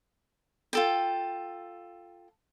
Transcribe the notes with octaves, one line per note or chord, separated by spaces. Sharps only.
F4 A4 G5